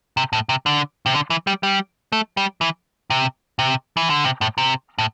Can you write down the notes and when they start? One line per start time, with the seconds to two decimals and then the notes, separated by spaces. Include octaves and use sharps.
0.17 C3
0.33 A2
0.49 C3
0.66 D3
1.06 C3
1.14 D3
1.30 E3
1.47 G3
1.63 G3
2.12 A3
2.37 G3
2.61 E3
3.10 C3
3.59 C3
3.97 E3
4.10 D3
4.24 C3
4.41 A2
4.58 C3
4.98 A2